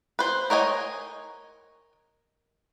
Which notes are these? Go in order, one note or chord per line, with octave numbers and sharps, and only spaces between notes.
B4 C5
A#4 C#5 D#5 G5 G#5